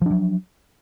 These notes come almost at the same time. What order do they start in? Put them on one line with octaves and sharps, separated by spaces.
F3 D4 F#3